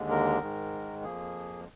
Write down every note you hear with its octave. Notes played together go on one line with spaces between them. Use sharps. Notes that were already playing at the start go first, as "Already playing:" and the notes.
Already playing: D#2 D3 G#3
A#4
G#2 D#3 G#3
F2 F3 A#3 G#4